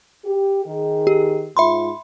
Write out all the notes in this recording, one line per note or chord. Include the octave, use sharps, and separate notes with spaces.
G4
D#3 G#4
G4
G#2 F4 E5 B5 C6